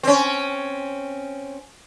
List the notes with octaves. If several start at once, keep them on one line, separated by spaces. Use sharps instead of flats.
C4 C#4